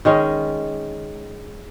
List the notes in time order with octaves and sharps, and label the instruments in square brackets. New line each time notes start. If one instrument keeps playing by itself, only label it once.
[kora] D#3 G#3 C#4